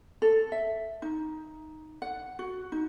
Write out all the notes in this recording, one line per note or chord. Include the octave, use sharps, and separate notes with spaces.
A4
E5
D#4
F#5
F#4
D#4